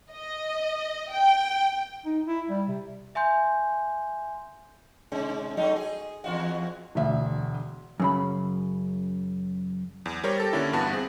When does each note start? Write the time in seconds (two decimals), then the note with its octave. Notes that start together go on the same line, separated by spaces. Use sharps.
0.11 D#5
1.11 G5
2.05 D#4
2.26 E4
2.50 G3
2.68 C3
3.15 E5 G#5 C6 G6
5.12 G#2 C3 G#3
5.57 F#3 A3 D#4
5.76 G#4
6.24 E2 F4 F#4
6.95 E1 D2 E5
8.00 F#2 C#3 B5
10.06 E2
10.24 G3 A#4 C5 C#5 A#6
10.38 G4 A4 A6
10.53 D3 A#3 C#4 E4
10.73 G2 E3 B3 F#4 A5
10.93 C4 G#4